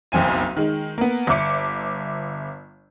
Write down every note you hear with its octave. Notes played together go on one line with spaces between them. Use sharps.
F#1 B1 F2 C4 G#5 D#7
D#3 G#3
A#3 B3
G1 E5 D6 C#7